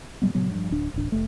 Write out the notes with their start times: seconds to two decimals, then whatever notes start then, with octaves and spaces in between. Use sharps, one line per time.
0.22 A#2 F#3 G3 B3
0.34 A#2 C#3 F#3 B3
0.51 G2 F3
0.71 D1 D4
0.94 D1 A1 D4
1.12 F1 A3